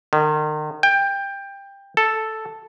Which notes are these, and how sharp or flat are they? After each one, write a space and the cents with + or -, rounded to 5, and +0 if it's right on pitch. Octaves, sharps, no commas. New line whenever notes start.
D#3 -35
G5 +20
A4 +0